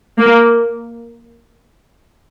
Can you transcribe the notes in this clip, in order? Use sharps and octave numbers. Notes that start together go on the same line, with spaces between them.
A#3